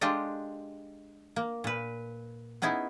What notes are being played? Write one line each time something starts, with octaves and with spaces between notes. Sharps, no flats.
G#3 D4 F4 G4 A4 D#5
A#3
A#2 B4
B3 C#4 D#4 E4 G#4